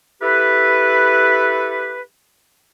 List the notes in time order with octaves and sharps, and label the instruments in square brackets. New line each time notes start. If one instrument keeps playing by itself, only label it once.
[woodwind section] E4 G4 A4 B4